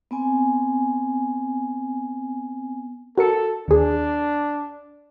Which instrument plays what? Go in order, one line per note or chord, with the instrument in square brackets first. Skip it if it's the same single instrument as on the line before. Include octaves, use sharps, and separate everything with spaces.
[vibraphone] B3 C4 G#5
[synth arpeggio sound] F#4 A#4 C#7 [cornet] A4
[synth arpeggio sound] D#2 G#4 [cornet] D4